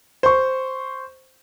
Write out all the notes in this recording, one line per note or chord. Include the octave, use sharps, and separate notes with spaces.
C5 C#6